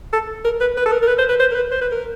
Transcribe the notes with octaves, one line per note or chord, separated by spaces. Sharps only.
A4
A#4
B4
B4
A4
A#4
A#4
B4
C5
B4
C5
A#4
B4
C5
B4
A#4